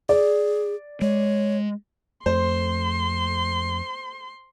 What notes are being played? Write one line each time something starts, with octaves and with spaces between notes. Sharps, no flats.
G#4 D5
G#3 C#5
F2 A3 C5 C6